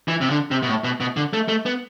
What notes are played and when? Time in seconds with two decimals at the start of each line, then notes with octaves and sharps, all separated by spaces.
0.08 E3
0.21 C3
0.30 D3
0.51 C3
0.63 B2
0.68 A2
0.84 B2
1.00 B2
1.17 D3
1.33 A3
1.48 A3
1.66 B3